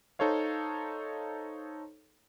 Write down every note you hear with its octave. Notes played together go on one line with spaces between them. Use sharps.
D#4 A4 C5 C#5 F5